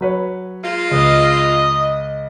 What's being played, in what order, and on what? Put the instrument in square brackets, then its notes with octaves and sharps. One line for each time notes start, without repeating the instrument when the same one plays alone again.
[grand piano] F#3 B4 C#5
[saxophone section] G#3 A#3 F4
[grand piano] C#2 B4 [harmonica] D#5